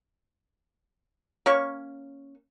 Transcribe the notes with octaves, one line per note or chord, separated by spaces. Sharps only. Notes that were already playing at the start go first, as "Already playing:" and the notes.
A#3 C#4 C#6